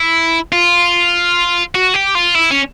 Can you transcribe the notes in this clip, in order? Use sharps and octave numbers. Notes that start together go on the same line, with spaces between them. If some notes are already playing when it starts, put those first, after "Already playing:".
Already playing: E4
F4
F#4
G4
F4
E4
C#4